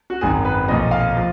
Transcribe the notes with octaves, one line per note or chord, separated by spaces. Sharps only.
F#4
G#1 F#2 D#3 G#4
B4
B1 A#2 F3 D#5
F5
F3